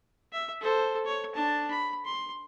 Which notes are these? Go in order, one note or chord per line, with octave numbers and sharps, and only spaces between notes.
E5
A4 C5
C#5
D4 A5
B5
C6